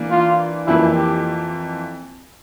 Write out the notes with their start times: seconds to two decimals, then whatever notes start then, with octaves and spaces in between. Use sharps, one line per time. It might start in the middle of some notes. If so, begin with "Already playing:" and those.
Already playing: E3 A#3 D4
0.11 F4
0.67 F2 E3 A#3 E4
0.95 G4